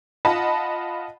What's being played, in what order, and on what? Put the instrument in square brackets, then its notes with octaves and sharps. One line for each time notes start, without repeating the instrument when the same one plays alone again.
[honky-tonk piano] F4 D#5 F#5 A5 B5